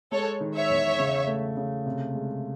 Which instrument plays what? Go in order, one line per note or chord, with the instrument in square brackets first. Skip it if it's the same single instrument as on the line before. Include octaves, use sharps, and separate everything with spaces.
[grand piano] G#3 [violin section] A4 C#5
[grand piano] D#3
[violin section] C#5 E5
[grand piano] E2
C#3
A3
C#3
C3
G#3